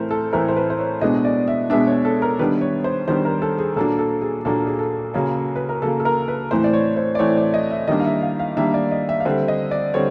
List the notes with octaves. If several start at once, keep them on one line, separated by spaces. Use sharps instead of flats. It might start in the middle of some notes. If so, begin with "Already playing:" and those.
Already playing: A2 E3 A3 C4 A#4 C5
A4
A2 E3 A3 C4 A#4
C5
B4
C5
C#5
B2 G#3 B3 D4 D#5
D5
E5
B2 G#3 B3 D4 E5
C#5
A4
A#4
D#3 G3 B3 D4 B4
C#5
C5
D#3 G3 B3 D4 C5
A#4
A4
G#4
A#2 F#3 A#3 D4 A4
A4
G#4
A#2 F#3 A#3 D4 A4
G#4
A4
C#3 F#3 A#3
B4
A#4
C#3 F#3 A#3 A4
A4
A#4
B4
A2 E3 A3 C4 C5
D5
C#5
C5
D5
A2 E3 A3 C4 C#5
D5
D#5
E5
D#3 G3 A#3 D4 D#5
F5
E5
F5
F5
D#3 G3 A#3 D4 E5
D5
D#5
E5
F5
D3 G3 C4 E5
D#5
D5
D3 G3 C4 C#5